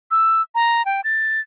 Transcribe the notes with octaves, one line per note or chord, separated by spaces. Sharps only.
E6
A#5
G5
A6